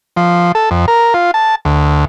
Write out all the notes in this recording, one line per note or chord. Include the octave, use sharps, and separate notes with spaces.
F3
A4
F2
A#4
F4
A5
D2